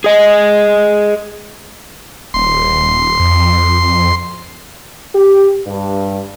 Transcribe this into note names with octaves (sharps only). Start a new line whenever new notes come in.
G#4 D#5
D#1 C6
F2
G4
G2